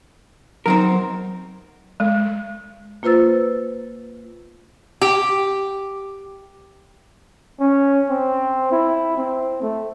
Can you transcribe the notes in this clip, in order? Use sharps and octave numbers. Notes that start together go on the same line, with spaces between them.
F#3 C4 D#4 A#4
G#3
A#3 F4 B4 C5 E6 A6
G4
C#4
C4
E4
C4
A3